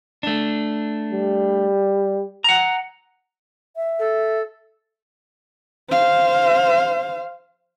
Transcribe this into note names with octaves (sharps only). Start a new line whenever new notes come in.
A3 D4
G3
F#5 A#5
E5
A4
C5 F5